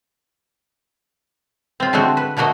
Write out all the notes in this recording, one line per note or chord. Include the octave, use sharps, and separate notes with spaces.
C4 F4
D3 G#3 A3 C4 F#4
B4
D3 A3 A#3 F#4 D#5